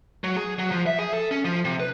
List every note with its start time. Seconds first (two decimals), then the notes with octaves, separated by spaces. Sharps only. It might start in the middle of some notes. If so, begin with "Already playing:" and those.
0.24 F#3
0.37 G#4
0.59 F#3
0.72 F3
0.87 E5
0.99 G#4
1.14 A4
1.31 C#4
1.45 F3
1.65 C3
1.80 B4